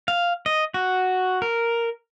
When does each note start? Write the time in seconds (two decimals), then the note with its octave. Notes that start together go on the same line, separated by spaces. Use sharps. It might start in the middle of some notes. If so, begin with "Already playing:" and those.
0.08 F5
0.46 D#5
0.74 F#4
1.42 A#4